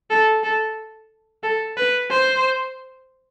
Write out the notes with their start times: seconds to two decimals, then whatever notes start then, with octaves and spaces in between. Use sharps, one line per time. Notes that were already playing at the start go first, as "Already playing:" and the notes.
0.10 A4
0.44 A4
1.43 A4
1.77 B4
2.10 C5